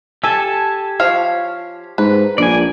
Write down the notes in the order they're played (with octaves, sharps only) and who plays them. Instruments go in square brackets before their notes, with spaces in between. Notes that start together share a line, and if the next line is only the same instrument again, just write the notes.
[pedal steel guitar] G4 G#5 A5 [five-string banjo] A4
[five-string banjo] F3 C#5 F5
[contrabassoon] G#2 [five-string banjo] B4
[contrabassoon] A#1 [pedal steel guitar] D5 G#5